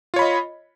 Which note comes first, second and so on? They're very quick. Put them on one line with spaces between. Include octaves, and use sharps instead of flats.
F4 C#5 B5 D#5